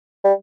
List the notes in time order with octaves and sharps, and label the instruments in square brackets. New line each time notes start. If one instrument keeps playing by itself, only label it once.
[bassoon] G3